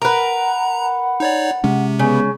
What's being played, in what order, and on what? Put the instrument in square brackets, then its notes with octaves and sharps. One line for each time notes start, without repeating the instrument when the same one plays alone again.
[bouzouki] A#4 B4 [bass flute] F#5 [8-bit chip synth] A#5
[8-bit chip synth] D#4 C#5 D5
[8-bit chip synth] C3 [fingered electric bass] G#3 C#4
[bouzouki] C#3 [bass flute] B3